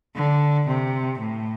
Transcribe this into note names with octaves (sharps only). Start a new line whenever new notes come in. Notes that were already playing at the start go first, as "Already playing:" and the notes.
D3
C3
A2